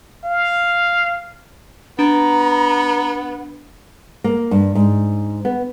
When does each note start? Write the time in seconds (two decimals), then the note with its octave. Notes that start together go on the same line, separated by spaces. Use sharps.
0.25 F5
1.99 B3 D4 A#5
4.24 A#3
4.51 G2
4.75 G#2
5.45 B3